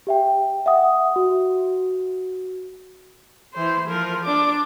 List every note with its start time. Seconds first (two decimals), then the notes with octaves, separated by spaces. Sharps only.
0.07 G4 E5 G5
0.66 E5 F#5 D#6
1.16 F#4
3.53 E3 C5
3.88 F3 A#4
4.25 D4 D6